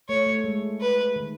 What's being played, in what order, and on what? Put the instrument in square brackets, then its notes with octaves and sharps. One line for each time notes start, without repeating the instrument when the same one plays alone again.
[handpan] A3 [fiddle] C#5
[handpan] A3
G#3
[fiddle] B4
[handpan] D#3